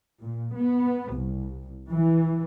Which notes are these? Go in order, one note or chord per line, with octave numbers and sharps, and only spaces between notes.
A#2
B3
C2
E3